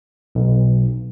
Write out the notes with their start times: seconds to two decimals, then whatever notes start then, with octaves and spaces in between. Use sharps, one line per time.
0.35 B1